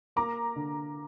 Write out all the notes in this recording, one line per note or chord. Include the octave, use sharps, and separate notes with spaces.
A#3 A#5 D6
D3